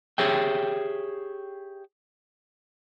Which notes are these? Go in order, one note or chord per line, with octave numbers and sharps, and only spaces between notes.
G4 G#4 C#5 E5 G5